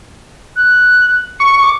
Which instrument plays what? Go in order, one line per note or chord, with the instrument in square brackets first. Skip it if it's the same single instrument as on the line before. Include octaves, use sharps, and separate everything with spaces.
[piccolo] F#6
[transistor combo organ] C#6 [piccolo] C#7
[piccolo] D6